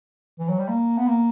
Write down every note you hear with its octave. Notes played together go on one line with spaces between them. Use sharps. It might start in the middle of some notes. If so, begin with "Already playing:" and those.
E3
F#3
G3
A#3
B3
A#3